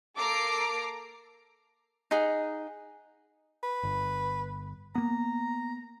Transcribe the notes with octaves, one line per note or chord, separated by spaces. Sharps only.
A#3 A4 A#5 D6 C7 D7
D#4 G#4 F#5
B4
G1
A#3 B3 A#5